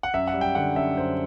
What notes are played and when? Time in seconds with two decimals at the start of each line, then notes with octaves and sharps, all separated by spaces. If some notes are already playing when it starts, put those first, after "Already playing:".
0.03 F#5
0.14 F#2 E5
0.28 F#5
0.34 G3
0.41 G5
0.55 D3 F#5
0.76 F#2 E5
0.97 F#2 C5